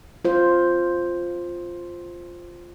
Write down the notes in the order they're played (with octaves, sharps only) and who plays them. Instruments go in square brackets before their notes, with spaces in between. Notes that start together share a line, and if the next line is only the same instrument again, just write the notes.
[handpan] F4 C5